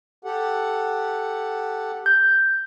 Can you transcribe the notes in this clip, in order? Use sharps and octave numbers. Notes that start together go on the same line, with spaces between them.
G4 A4 F#5
G6